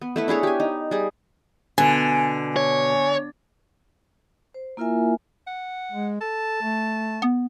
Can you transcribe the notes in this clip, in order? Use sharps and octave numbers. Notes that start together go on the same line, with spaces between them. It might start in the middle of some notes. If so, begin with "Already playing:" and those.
B3
A3 E4 B4
D4 E4 G#4 C#5
G4 G#5
D#4
G3 G#4
B2 D3 G#5
C#5
C5
A#3 E4 F4 A#4 E5 G#5
F#5
G#3
A4 A5
A3
B3